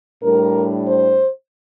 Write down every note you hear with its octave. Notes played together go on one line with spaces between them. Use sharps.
A2 G3 D4 A#4
C5